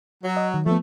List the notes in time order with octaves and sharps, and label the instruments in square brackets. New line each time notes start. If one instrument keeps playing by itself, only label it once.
[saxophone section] F#3
[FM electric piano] D#5
D#3
[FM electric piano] F3 B3 [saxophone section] A3